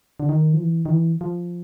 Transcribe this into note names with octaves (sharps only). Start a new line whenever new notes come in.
D3
D#3
F3
E3
D#3
E3
F3